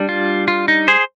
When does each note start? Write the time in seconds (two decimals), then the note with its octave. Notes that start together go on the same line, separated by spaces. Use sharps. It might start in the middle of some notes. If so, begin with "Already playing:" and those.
Already playing: G3 D4
0.09 F4
0.48 F4
0.68 D#4
0.88 G#4 C5